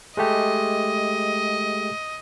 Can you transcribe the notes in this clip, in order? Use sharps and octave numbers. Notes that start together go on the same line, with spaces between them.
G#3 A3 G4 D#5